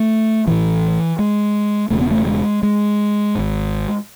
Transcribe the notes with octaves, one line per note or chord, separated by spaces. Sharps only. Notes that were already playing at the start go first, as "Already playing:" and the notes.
Already playing: A3
A1 A2 E3
G#3
E1 E2 C#3 A3
B3
A3
G#3
G#3
G#1 G#2